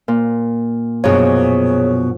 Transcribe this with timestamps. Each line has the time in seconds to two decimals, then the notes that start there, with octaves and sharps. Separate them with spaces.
0.08 A#2
1.04 F#2 B2 F3 D4 G#4 C#5